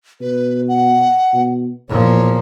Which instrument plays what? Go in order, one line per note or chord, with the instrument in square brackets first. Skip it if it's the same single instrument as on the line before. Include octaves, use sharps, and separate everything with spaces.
[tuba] B2 [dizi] B4
[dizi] F#5
[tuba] B2
[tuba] E2 [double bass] A#2 F3 [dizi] C#5